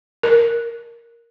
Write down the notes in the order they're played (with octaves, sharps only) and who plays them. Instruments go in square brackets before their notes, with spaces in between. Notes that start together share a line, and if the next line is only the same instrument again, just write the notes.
[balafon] A#4